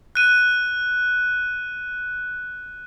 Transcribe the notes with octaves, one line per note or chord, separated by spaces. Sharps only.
F#6 D#7